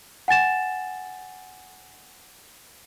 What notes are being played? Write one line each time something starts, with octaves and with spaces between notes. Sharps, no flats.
F#5 G#5 A6 E7